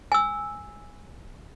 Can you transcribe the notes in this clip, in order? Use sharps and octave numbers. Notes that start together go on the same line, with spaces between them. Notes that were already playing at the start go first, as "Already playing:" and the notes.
G#5 E6